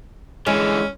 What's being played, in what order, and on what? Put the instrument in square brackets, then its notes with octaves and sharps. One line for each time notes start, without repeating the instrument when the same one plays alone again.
[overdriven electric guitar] D3 E3 [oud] G#3 [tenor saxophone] C#4